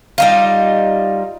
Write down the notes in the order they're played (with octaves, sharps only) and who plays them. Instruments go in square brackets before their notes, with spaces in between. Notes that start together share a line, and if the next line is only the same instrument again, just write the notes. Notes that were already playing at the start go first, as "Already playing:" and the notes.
[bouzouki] G3 D#4 F4